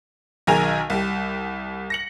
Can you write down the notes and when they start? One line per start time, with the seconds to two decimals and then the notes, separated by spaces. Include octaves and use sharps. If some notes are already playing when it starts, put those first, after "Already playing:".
0.47 B1 D#3 G#4 A#4 G#5 F7
0.90 C2 G4
1.90 A#6 C#7 F#7